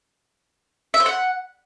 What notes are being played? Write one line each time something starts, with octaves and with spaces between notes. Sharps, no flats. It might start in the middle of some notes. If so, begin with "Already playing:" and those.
E5
C5
F#5